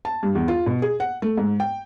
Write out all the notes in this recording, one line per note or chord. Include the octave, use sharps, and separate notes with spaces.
A5
G2
E2
F4
B2
G#4
F#5
A3
G#2
G5